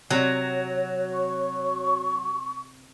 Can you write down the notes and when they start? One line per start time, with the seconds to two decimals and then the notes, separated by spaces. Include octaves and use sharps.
0.10 C3 F#3 C#5
1.13 C#6